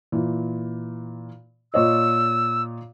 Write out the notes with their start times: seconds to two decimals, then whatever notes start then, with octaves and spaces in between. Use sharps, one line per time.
0.12 A#2 E3
1.74 A#2 C#5 D#5 E6